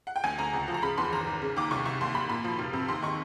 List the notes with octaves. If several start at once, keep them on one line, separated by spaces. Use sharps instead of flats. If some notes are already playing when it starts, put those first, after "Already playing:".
F#5
G5
D2 G#5
D2 A#5
C#2
F3
A#5
C#3 B5
E2 C6
G#1 A#5
G#1
C#3
D#2 D6
C2 C#6
C2 C#6
D#2 C6
D#2 B5
A#2 B5
F3
F1
C3
D#2 C6
D#3 C#6